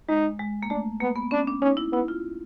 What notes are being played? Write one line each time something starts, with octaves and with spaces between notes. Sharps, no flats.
G#3 D#4
G#3
A#3
A3 D4
A#3 B3
B3
C#4 D4
D4
C#4 D#4
E4
B3 E4
F4